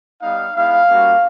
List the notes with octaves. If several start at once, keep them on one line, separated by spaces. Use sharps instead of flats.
G3 B3 D#4 F5
G#3 B3 E4 F5
G3 A#3 C#4 F#4